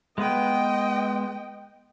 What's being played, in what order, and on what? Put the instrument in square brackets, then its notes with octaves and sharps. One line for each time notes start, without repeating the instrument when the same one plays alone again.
[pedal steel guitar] G#3 B3 B4 [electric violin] D#5 G5